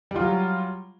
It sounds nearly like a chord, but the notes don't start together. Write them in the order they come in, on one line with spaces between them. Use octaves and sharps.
G3 F4 F#3